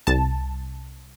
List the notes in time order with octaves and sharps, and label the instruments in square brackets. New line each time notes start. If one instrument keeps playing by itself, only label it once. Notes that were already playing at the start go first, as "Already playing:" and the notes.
[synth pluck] C2 A5